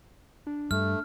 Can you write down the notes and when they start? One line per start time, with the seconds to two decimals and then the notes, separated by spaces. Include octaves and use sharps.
0.47 D4
0.71 G2 A3 F6